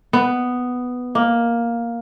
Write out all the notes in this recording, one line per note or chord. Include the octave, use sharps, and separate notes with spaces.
B3
A#3